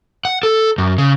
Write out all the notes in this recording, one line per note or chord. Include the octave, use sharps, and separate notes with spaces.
F#5
A4
F#2
C#3